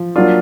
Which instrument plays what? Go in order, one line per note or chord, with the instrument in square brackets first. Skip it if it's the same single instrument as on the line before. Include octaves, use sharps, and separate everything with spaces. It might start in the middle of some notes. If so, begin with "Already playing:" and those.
Already playing: [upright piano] F3
[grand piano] F#3 A#3 D4 F4